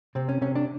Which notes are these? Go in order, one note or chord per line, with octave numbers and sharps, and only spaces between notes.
C3 C4
C#4
C3 C#4
D4